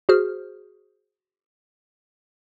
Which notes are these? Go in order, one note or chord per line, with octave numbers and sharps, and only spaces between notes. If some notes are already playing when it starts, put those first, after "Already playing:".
F#4 G#4 C5 F6